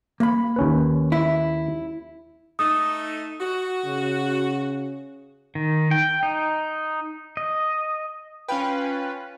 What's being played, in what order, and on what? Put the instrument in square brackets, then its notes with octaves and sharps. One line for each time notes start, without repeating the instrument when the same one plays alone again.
[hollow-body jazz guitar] A#3 B5
[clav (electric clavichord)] D#2 C#4 B4
[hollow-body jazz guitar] E4
[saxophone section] A3 D#4 [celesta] D#6
[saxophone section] F#4
[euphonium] C#3
[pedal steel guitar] D#3
G5
D#4
D#5
[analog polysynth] C#4 F4 B4 [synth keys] G5 G#5 B5